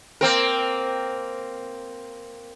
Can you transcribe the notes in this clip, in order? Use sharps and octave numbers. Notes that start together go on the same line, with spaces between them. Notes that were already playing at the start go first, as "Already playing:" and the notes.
A#3 C4 A#4